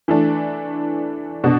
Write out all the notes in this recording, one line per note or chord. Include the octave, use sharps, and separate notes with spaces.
E3 A3 D4
B2 D4 F#4